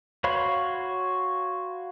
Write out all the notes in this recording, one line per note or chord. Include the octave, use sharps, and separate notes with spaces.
F#4 C#5 F5 B5 C6